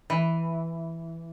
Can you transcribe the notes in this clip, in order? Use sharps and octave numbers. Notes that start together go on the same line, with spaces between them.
E3